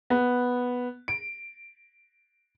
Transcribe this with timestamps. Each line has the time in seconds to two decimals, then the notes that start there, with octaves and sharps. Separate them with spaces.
0.10 B3
1.08 D7